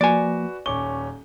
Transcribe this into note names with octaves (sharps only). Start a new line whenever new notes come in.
F3 A#3 F#4 B4 D5 G#5
D#1 C#4 C#6 D6 G7